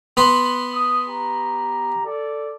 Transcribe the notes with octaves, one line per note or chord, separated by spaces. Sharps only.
B3 B5 C6
D#6
G4 A#5
A4 D5